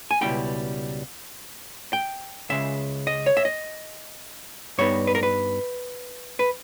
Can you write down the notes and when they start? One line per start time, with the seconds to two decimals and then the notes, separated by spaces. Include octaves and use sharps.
0.11 G#5
0.21 C#2 B2 G3 C#4 E4 G5
1.93 G5
2.49 C#2 C#3 G#3 E5
3.07 D#5
3.26 C#5
3.37 E5
3.45 D#5
4.78 G2 G3 B3 D#4 C#5
5.07 B4
5.15 A#4
5.23 B4
6.39 B4